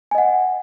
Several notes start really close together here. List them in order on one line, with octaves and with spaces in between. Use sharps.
G#5 D#5 F#5